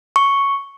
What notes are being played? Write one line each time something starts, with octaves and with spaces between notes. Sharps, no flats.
C#6